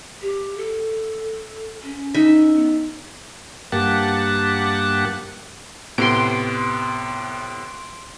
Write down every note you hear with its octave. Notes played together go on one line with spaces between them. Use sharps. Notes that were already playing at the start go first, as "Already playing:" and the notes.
G4
A4
C#4
D#4 E5
B3
G2 A#3 G4 F#5 A5
A2 C3 B3 C6 D7